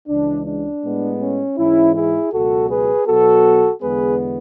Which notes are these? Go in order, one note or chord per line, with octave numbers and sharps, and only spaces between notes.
C#2 C#3 E3 G#3 D4
D4
A2 G#3 B3
C#4
G#2 E3 G#3 C#4 E4
E4 G#4
C#2 B2 F#3 F#4 A4
G#4 B4
B2 F#3 B3 F#4 A4
E2 D3 G#3 B3 G#4 B4